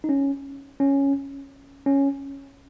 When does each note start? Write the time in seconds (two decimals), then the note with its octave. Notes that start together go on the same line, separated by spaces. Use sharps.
0.04 D#4
0.09 C#4
0.80 C#4
1.86 C#4